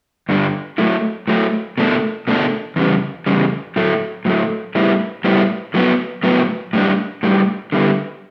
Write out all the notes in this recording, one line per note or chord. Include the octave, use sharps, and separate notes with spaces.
G2 D3 G3 D4
A2 F#3 A3 E4
A2 F#3 A3 E4
B2 A3 D4
B2 A3 D4
E2 C#3 G3
E2 C#3 G3
A2 F#3 A3
A2 F#3 A3
A2 G3 B3 E4
A2 G3 B3 E4
A2 F#3 B3
A2 F#3 B3
A2 G3 D4
A2 G3 D4
D3 G3 B3 E4